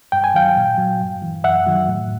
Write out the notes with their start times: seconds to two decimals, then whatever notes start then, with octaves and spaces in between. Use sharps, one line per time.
0.12 G2 G5
0.24 G#5
0.34 D#3 F#3 F5 G5
0.56 A#2
0.78 F#3
1.01 G2
1.22 E3
1.44 F#2 E5 F#5
1.67 D#3 F#3
1.88 A2